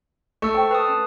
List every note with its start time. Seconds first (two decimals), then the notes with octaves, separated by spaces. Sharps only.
0.42 A3 C#6 E6
0.54 C5 G5
0.71 B4 A5 D#6
0.88 C#4